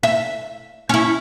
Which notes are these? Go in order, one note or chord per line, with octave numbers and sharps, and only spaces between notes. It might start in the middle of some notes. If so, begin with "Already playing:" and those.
E5
C#4 E4